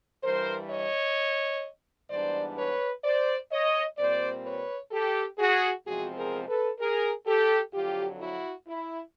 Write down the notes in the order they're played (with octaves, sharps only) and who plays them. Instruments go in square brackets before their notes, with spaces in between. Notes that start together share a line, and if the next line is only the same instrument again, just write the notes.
[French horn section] G2 E3 G3 A#4 C5
C#5 D#5
G#2 E3 G3 B3 D4 C5 D5
B4 C#5
C5 D5
C#5 D#5
A#2 G3 C4 C5 D5
B4 C#5
G4 A4
F#4 G#4
E2 C3 F3 G#3 C4 F#4 G#4
G#4 A#4
A4 B4
G#4 A#4
G4 A4
F2 D3 F#3 F4 G4
E4 F#4
E4